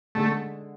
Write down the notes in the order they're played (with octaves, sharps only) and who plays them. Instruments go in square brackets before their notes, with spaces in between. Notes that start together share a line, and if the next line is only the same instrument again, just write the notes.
[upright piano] D3 G#3 D4 G#4 [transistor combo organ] A3